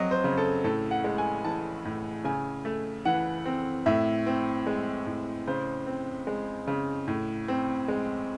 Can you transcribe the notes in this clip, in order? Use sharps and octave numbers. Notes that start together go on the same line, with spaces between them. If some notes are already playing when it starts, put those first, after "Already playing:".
Already playing: F#3 C4 D#5
C5
C#3
A4
A2 A4
F#5
G#3
G#5
E3 A5
A2
C#3 G#5
A3
E3 F#5
C4
A2 E5
C4
G#3
A2
C#3 C5
C4
G#3
C#3
A2
C4
G#3